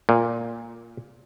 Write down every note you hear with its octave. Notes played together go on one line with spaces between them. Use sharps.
A#2